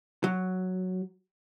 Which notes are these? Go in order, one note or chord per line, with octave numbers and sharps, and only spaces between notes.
F#3